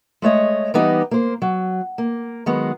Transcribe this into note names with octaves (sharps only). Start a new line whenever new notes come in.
G#3 A3 C#5 D#5
E3 G3 B3 D#4 G4 D#5
A#3 C5
F#3
A#3
D#3 F#3 G#3 B3